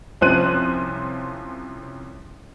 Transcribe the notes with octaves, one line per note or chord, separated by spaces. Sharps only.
C2 F3 C#4 C5 F#6 D#7